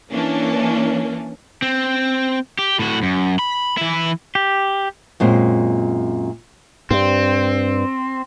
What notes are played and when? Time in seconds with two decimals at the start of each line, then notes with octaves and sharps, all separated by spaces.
0.11 E3 A#3 C#4 D4
1.62 C4
2.59 G4
2.79 A2 F#4
3.03 F#2
3.39 B5
3.78 E3 E4
4.35 G4
5.20 F#2 A#2 G#3 C4
6.91 G2 C4